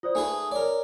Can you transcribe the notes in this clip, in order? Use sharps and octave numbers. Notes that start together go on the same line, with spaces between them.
F4 C5 D5 D#6
A3 D#4 G#4 B4 G#5
A#4 C#5 D5